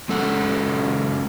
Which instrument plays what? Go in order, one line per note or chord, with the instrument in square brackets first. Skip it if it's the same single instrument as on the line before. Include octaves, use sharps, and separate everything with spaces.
[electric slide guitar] G#3 C#4 A4 F#5